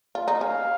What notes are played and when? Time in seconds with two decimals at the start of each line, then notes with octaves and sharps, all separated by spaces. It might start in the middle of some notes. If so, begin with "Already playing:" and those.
0.15 F4
0.28 D#4
0.41 C#4 F5